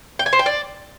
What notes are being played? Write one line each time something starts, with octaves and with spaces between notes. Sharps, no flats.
G5
G#5
C5
G5
D5